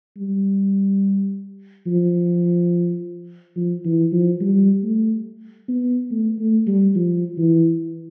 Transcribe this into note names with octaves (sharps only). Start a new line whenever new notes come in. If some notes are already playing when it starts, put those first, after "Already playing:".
G3
F3
F3
E3
F3
G3
A3
B3
A3
A3
G3
F3
E3